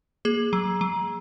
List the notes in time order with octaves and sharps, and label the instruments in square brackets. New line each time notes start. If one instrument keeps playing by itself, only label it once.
[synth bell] A#3 G#4
F#3
F#3